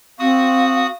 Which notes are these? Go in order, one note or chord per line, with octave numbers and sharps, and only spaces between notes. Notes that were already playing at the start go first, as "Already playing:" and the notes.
C4 F#4 F5 D#6